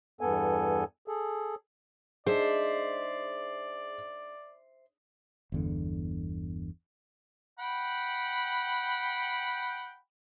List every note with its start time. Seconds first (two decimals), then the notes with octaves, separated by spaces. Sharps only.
0.21 E2 G2 B3 A4 G#5
1.08 G#4 A4
2.26 G#3 D4 D#4 G#4 C5 D5 E5
5.52 G1 E2 D3
7.59 F#5 G5 B5